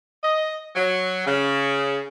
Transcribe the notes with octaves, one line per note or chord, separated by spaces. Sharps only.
D#5
F#3
C#3